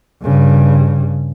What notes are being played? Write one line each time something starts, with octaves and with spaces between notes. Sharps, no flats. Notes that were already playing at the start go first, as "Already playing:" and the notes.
G2 C#3